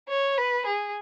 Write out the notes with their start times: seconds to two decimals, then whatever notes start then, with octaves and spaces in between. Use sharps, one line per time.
0.09 C#5
0.37 B4
0.66 G#4